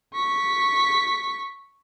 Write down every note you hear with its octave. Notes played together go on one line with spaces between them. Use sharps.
C#6 B6